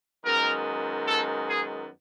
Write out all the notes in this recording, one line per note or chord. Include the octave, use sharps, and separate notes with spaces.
F#2 D#3 G#3 B3 A#4
A4
G#4